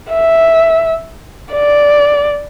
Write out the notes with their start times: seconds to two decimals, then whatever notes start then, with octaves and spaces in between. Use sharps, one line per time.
0.11 E5
1.53 D5